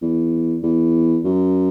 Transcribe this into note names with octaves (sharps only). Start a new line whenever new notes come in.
E2
E2
F#2